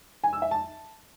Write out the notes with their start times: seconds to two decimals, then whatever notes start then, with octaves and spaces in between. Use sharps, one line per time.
0.24 G#5
0.33 E6
0.42 E5
0.51 A5